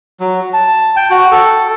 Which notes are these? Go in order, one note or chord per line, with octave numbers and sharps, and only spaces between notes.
F#3
A5
G5
F#4
A4